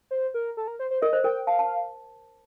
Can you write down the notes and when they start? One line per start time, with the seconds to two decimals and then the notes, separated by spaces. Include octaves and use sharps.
0.11 C5
0.34 A#4
0.57 A4
0.67 A#4
0.79 C5
0.91 C5
1.02 A#4 D#5
1.13 C5
1.24 A#4 G5
1.47 F5 A5
1.59 A5